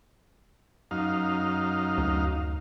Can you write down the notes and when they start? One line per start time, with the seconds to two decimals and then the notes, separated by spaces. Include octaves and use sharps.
0.91 F#2 D#4 F5
1.98 D2